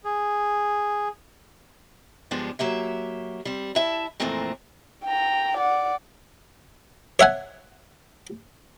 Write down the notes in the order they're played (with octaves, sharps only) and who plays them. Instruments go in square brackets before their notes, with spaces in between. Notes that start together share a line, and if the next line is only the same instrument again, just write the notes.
[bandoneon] G#4
[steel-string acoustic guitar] G2 F3 G3 G#3 B3 D4
F#3 A#3 G4 E5
G3 C4
E4 E5 A5
F2 A#2 E3 A3 A#3 C4
[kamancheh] G5 A#5
D5 F#5
[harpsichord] C#5 E5 F#5 G#5